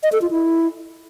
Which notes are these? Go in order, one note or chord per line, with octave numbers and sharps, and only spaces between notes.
D#5
A4
F4
E4